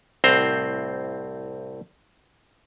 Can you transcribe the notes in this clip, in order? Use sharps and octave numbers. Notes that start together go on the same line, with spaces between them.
C2 A2 C4 C5 A#5